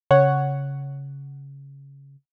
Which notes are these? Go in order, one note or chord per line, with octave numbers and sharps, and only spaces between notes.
C#3 C#5 F#5